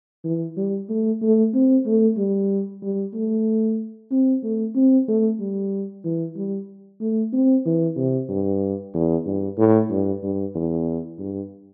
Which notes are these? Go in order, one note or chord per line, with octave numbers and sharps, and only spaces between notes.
E3
G3
A3
A3
C4
A3
G3
G3
A3
C4
A3
C4
A3
G3
E3
G3
A3
C4
E3
C3
G2
E2
G2
A2
G2
G2
E2
G2